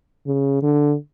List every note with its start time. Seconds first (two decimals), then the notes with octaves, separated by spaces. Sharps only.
0.26 C#3
0.62 D3